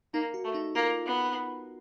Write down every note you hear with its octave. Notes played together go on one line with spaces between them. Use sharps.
A#3 D#4
F#4
A3
D#4
A#3 F4
B3